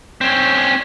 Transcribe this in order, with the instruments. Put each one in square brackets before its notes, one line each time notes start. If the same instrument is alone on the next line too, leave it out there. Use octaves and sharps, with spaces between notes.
[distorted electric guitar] C4 C#4